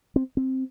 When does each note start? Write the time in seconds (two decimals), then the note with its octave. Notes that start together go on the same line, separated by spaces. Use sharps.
0.16 C4
0.37 C4